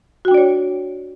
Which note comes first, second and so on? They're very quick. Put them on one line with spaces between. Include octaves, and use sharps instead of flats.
F#4 G5 D4 D5 C#5